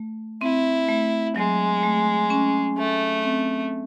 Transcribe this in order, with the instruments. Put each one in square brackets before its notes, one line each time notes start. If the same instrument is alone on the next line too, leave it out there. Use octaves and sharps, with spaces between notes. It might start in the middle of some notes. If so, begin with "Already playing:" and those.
Already playing: [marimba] A3
[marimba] C4 [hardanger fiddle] E4
[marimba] A3
[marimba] F#3 [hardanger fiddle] G#3
[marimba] A3
C#4
[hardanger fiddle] A3
[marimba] C4